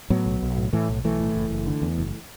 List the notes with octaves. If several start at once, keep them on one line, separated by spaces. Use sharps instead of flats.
A2 F#3 B3
B1
B1
A2
A2 E3 A3
B1
B1 E3 A3
A2
F#1
F#1
D3
E2
F#1